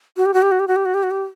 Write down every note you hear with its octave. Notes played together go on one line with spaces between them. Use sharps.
F#4
G4
F#4
G4
F#4
G4
F#4
G4
F#4
G4
F#4
G4